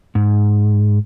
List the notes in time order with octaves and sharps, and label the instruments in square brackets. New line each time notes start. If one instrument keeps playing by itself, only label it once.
[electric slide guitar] G#2